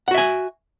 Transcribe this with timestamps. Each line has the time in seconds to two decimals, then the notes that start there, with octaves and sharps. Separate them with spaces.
0.08 F#5
0.11 F#4
0.14 E5
0.18 G#5